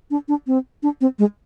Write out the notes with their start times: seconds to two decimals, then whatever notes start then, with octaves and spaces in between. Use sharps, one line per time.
0.11 D4
0.28 D4
0.47 C4
0.83 D4
1.01 C4
1.19 G#3